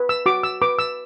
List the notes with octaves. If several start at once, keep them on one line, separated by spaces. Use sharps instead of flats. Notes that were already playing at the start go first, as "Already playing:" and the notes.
Already playing: B4
E6
F#4 D6
E6
B4 D6
E6